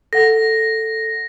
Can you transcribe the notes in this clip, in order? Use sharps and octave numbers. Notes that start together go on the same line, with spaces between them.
A4 F#5 A#6